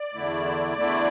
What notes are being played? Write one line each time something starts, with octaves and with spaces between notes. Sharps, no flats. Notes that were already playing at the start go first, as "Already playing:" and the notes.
Already playing: D5
E2 D3 A3 E4
E2 D3 A3 E4